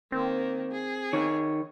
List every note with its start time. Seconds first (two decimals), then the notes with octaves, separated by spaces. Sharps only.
0.12 D#3 A#3 C4
0.72 G#4
1.13 D#3 C#5